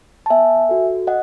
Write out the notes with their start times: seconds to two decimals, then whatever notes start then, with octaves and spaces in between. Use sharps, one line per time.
0.26 A5
0.30 B3 E5 G#5
0.69 F#4 A4
1.07 D#5 F#5